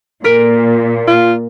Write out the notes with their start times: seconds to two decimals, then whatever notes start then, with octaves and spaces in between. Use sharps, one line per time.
0.24 A#2 A#4 B6 D7
1.07 F4